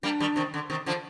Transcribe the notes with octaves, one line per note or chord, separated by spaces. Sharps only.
G3 A#3 D4
D#3 G3
C3 D#3
D3
C3 D#3
D3 F3